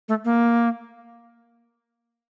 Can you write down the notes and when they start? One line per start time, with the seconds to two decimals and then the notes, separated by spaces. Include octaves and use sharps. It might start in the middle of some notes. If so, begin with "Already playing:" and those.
0.09 A3
0.25 A#3